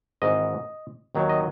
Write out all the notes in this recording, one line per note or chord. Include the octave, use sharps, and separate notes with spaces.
G#1 G#2 E3 G#3 D#5
D#2 D#3 F#3
D#5